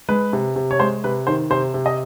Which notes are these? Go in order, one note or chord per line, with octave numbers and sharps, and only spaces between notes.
G#3 B4
C3
C3
C#5
G#3 C5
C3 B4
D#3 C5
C3 C5
C3
D#5